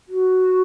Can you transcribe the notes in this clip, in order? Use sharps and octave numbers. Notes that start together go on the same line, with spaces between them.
F#4